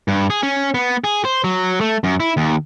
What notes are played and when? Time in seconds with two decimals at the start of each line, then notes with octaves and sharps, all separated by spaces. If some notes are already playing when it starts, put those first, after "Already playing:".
0.08 G2
0.30 G#4
0.43 C#4
0.74 B3
1.04 G#4
1.25 C5
1.44 F#3
1.81 A3
2.04 F#2
2.20 E4
2.37 D#2